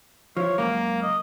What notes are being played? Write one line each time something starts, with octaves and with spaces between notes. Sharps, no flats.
F3 E4 C#5
C#2 F#2 A#3 A#4
D#5